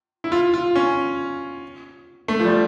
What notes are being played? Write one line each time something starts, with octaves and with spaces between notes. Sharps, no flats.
E4
F4
F4
C#4
A3
F3
G3